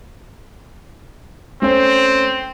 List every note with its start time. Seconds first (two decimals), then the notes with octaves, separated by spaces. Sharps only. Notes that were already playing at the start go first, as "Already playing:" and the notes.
1.62 A3 C4 C#4 C5